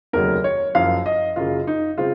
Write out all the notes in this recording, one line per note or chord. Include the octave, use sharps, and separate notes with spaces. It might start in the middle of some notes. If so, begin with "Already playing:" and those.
F1 D#2 C#3 F#3 A#4
C#5
F#1 F#2 F3 F5
D#5
F#1 F#2 C#3 F4
D#4
C#3 G#3 C4 F4